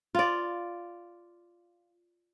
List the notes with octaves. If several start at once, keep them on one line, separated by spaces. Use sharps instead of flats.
F4 D5